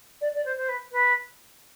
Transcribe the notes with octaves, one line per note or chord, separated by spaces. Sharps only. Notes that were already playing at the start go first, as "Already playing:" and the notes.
D5
D5
C5
C5
B4
B4